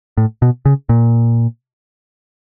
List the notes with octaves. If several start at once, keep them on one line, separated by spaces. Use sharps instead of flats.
A2
B2
C#3
A#2